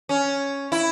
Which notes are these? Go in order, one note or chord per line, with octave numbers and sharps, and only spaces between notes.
C#4
E4